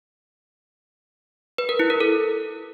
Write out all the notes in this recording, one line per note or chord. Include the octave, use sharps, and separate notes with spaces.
B4
A#4
E4
A#4
A4